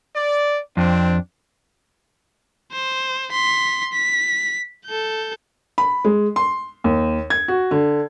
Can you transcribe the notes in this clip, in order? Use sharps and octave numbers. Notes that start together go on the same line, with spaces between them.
D5
F2 C4 D4
C5
C6 B6
B6
A4 G6
B5
G#3
C6
D#2
G#6
F#4
D3